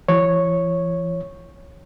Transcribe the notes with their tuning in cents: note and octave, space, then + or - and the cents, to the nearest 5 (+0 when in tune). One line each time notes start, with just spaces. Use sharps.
E3 +45 C#5 -5